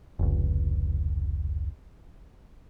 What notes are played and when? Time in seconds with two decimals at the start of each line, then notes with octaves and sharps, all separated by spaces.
0.19 F1 C#2